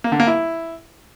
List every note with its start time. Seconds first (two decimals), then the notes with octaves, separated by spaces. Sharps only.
0.04 A#3
0.12 D3
0.20 A#3
0.27 E4